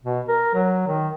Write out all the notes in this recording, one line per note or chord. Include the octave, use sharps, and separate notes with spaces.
B2
A#4
F#3
D#3